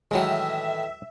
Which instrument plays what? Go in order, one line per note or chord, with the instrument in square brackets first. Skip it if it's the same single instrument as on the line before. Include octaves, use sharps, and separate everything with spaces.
[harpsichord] A2 D#3 E3 [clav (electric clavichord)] F#3 G#3 [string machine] E5